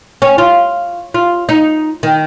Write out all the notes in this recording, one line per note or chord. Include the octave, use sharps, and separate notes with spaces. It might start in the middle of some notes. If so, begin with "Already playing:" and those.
C#4
F4
F4
D#4
D#3